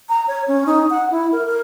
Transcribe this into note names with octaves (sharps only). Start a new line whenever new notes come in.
A#5
C#5
C#4
D#4
F#5
E4
A#4
A#4